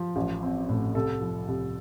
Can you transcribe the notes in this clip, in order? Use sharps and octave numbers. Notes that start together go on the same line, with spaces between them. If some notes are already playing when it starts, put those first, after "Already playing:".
Already playing: F3
A1
C4
A2
C2 A4
F3
C2